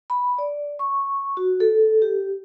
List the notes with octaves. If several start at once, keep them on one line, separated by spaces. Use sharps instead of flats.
B5
D5
C#6
F#4
A4
G4